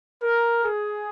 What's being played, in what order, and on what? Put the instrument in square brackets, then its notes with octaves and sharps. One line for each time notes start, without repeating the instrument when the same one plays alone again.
[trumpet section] A#4
G#4